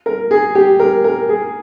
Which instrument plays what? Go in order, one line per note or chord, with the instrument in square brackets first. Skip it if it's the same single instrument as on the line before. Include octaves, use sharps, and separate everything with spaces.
[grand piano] A#4
G#4
G4
A#4
A#4
G#4